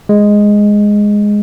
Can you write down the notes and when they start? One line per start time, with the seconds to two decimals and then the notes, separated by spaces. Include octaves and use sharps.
0.09 G#3